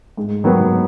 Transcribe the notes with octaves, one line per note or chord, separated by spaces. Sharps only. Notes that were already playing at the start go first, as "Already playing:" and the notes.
G#2
D#3 F#3 B3